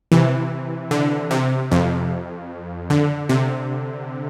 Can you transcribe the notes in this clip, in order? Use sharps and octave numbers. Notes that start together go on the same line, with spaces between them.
C3 E3
D3
C3
F2
D3
C3